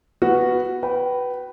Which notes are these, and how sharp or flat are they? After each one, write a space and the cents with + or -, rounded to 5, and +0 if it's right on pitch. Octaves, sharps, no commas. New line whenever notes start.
B3 +0 F#4 +0
B4 +0 G5 -30